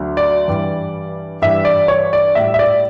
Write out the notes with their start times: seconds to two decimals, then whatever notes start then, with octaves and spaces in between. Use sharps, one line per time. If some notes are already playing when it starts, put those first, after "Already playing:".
Already playing: D2 D3 F#3
0.17 D5
0.48 G2 E3 G3
1.42 G2 E3 G3 E5
1.65 D5
1.88 C#5
2.13 D5
2.35 A2 G3 E5
2.54 E5
2.59 D5